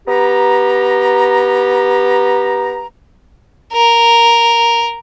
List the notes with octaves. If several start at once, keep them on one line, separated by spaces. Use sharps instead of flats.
B3 G4 A#5
A#4